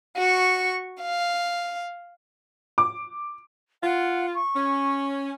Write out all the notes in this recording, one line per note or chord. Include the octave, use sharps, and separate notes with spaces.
F#4 C#6
F5
D6
F4 F#5
C#6
C#4